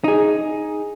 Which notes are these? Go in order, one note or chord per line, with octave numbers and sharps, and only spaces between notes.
D#4 G#4